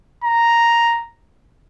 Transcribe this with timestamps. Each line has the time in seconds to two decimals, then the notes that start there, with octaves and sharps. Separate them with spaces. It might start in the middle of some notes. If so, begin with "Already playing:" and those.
0.24 A#5